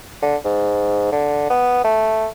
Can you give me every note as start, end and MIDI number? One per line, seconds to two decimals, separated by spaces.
0.22 0.36 50
0.45 1.10 44
1.13 1.49 50
1.50 1.83 59
1.84 2.28 57